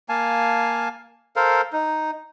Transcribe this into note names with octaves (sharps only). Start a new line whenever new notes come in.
A#3 F5 G#5 A5
A4 A#4 C5 F5
D#4